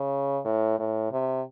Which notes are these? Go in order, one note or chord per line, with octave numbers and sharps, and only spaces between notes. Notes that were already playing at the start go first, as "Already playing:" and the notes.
Already playing: C#3
A2
A2
C3